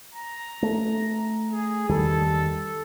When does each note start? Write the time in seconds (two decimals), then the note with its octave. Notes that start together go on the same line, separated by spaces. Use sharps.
0.15 A#5
0.62 A3
1.52 G#4
1.89 E2 D#3 G3 A4